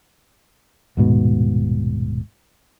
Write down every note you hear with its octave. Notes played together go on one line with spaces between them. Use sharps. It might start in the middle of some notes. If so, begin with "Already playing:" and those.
D#1 G#2 B2